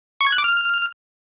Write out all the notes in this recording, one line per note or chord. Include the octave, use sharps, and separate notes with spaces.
C#6
G#6
F#6
D6
F6